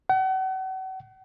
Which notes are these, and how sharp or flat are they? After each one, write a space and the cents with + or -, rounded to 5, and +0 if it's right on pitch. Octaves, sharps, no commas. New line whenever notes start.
F#5 +40